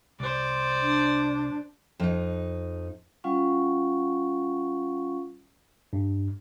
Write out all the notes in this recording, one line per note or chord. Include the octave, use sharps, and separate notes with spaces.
C2 C5 D5
D4
F2 D#4
G3 C#4 F4 F5 F#5 C#6
G2